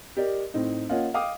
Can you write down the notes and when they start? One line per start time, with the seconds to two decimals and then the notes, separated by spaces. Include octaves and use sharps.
0.17 G4 A#4 D5 D#5
0.54 A2 C4 D#4
0.89 A#3 C#4 F4 D#5 F#5
1.14 D#5 F5 G5 D6 D#6